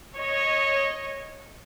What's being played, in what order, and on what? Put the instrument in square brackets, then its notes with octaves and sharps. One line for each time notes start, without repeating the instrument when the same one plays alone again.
[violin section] C#5 D#5